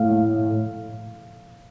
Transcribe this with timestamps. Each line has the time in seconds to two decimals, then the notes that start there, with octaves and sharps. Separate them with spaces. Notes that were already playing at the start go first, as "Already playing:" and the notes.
Already playing: A2 F5